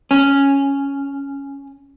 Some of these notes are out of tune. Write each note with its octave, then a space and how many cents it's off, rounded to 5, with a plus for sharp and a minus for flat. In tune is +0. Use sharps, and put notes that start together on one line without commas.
C#4 +0